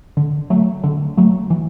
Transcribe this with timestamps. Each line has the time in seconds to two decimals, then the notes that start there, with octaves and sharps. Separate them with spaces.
0.17 D3
0.50 F#3 A3
0.84 D3
1.17 F#3 A3
1.50 E3